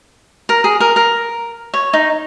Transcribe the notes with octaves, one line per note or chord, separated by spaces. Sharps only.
A#4
G#4
A#4
A#4
C#5
D#4